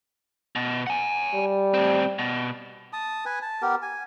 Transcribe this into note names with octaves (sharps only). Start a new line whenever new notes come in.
B2
F#5 G#5
G3
A2 C4
B2
A5 D#6
B4 G#5
A5
B3 G4 A#4
G#5